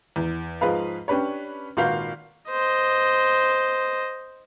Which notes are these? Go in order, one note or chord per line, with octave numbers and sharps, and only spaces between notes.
E2
G#2 F3 G#4 B4 F5
C#4 D4 G4 B4 C#5
G#1 A#2 F#4 B4 F5 G6
C5 D#5